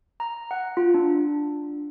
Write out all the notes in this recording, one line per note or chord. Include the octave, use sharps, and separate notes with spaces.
A#5
F#5
F4
D4